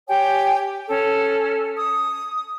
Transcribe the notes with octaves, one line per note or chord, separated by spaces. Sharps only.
G4 C#5 G5 G#5
C#4 A4
D#6